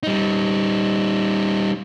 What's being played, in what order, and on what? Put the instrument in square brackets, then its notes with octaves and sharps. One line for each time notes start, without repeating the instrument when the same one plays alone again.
[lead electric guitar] G3 D#4